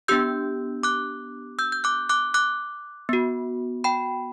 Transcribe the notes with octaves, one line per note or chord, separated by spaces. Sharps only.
B3 D4 G4 E6 G6
D6 F#6
E6 G6
G6
D6 F#6
D6 F#6
D6 F#6
B3 F#4
G5 B5